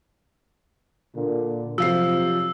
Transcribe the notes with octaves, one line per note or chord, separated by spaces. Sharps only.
A#2 D3
C3 F3 F#3 F5 E6 C7